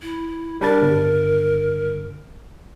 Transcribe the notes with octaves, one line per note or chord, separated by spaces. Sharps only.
E4
G3 D4 A#4 A6
G1